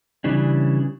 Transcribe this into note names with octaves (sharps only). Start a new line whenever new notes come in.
C#3 E3 G3 D4